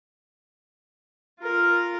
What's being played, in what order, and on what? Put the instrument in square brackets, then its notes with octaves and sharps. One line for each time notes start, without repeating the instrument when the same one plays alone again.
[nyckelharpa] F4 A#4